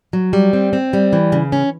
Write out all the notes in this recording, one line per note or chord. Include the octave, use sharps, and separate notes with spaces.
F#3
G3
C4
C4
G3
E3
C#3
C#4